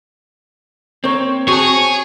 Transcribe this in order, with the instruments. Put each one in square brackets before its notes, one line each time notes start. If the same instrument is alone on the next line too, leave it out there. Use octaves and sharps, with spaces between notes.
[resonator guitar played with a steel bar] A#3 C#5 [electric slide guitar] C4
[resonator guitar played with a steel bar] F#4 A5 [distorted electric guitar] G#4 [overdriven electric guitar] C#5